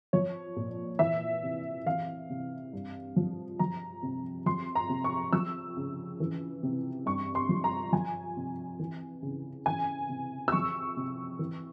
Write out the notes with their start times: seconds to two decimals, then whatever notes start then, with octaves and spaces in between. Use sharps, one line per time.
0.13 F3 C#5
0.56 A#2
0.99 E3 E5
1.43 C3
1.86 E3 F5
2.30 C3
2.73 G2
3.16 F3
3.59 F3 A#5
4.03 C3
4.46 F3 C6
4.75 A#5
4.89 C3
5.04 C#6
5.33 F3 E6
5.77 C#3
6.20 E3
6.63 C3
7.06 G2 C#6
7.35 C6
7.49 F3
7.64 A#5
7.92 F3 G#5
8.37 C3
8.79 E3
9.22 C#3
9.66 E3 G#5
10.09 C3
10.48 E6
10.52 F3 C#6
10.97 C3
11.39 E3